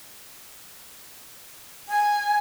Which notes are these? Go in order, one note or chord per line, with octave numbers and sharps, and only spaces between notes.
G#5